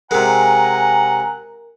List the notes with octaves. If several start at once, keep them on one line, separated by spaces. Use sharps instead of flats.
C3 G#3 A#4 F#5 G#5 A#5